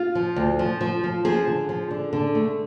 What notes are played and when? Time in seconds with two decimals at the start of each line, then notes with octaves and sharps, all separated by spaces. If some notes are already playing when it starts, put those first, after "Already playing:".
Already playing: F4
0.15 F3
0.36 D2
0.59 F3
0.81 F3
1.04 F3
1.25 F3 G#4
1.47 D3
1.69 F3
1.91 D3
2.13 D3
2.35 A3